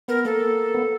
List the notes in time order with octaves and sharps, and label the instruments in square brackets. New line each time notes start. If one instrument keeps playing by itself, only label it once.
[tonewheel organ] B3 [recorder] A#4
[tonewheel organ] A#3 [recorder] A4
[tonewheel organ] B3